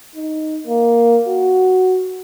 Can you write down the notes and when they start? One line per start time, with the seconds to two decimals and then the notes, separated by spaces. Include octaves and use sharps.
0.16 D#4
0.67 A#3
1.28 F#4